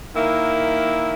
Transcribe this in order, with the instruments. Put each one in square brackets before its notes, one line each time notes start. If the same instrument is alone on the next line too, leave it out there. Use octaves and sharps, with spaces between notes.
[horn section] D#3 A#3 E4